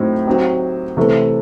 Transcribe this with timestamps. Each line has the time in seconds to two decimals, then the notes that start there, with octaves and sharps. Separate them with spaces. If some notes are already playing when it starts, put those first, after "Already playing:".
Already playing: A2 F#3 C4 D#4
0.26 F#3 C4 D#4 G4
0.97 C3 E3 A3